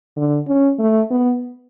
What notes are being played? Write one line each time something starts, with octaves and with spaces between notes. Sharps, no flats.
D3
C#4
A3
B3